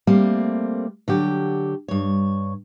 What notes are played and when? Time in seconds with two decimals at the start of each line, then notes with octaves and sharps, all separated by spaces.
0.07 G3 A3 A#3 C4
1.08 D3 F#3 G4
1.88 G2 C#5